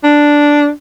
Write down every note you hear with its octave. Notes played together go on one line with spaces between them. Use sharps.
D4